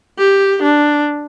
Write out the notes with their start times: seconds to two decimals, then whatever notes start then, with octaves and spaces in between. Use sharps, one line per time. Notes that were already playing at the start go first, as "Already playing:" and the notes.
0.19 G4
0.62 D4